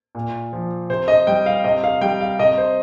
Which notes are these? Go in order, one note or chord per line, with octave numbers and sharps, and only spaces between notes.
A#2
F3
C3 C5
D#5
G3 G5
F5
C3 D#5
F5
G3 G5
F5
C3 D#5
C5